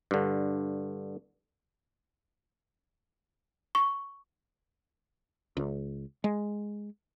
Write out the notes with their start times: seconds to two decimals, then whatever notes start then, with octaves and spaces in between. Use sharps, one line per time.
0.11 G2 D3
3.75 C#6
5.57 C#2
6.24 G#3